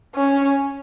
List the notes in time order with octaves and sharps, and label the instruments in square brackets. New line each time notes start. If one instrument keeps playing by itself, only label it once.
[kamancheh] C#4